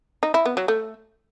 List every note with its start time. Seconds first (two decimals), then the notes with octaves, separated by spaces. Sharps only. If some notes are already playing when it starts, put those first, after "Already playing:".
0.23 D#4
0.34 E4
0.45 B3
0.57 F#3
0.68 A3